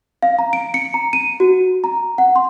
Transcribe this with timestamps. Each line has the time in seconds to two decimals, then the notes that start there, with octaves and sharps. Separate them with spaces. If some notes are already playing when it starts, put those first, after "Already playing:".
0.23 F5
0.39 A#5
0.53 D7
0.74 C#7
0.94 A#5
1.13 D#7
1.40 F#4
1.84 A#5
2.18 F#5
2.36 C6